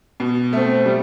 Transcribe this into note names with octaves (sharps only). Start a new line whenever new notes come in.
B2
A3 C4
G3